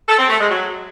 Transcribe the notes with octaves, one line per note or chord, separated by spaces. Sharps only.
A4
C4
A3
G#3
F#3